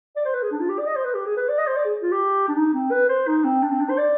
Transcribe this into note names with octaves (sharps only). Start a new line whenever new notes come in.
D5
C5
B4
G#4
D4
F4
G4
D5
D#5
C5
B4
G4
G#4
B4
D5
D#5
C5
D5
G#4
F4
G4
D4
D#4
C4
B4
C5
D#4
C4
D4
C4
D4
C5
D5